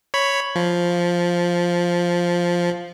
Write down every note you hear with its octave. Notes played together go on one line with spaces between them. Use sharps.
C#5 B5
F3